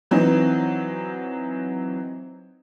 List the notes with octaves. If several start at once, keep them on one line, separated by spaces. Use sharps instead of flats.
E3 F#3 C4 D#4